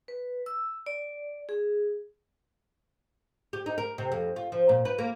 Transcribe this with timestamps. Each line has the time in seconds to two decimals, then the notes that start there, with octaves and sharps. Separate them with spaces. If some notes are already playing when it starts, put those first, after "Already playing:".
0.08 B4
0.46 E6
0.86 D5
1.49 G#4
3.53 G4
3.66 D#4
3.78 A#4
3.98 C3
4.12 F2
4.36 F4
4.52 F3
4.69 A#2
4.85 B4
4.98 A#3